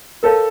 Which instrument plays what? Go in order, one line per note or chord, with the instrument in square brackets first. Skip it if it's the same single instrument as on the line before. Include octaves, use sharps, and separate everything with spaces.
[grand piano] A4 [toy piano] A#4 C#5 F5 A5